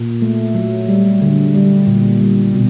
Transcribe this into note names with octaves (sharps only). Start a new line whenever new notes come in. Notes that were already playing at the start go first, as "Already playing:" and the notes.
Already playing: A#2
A3
F#3
G3
D3
G3
A#2
G3
B2